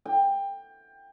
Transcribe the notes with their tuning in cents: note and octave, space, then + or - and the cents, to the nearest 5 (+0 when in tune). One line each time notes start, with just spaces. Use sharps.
G5 +20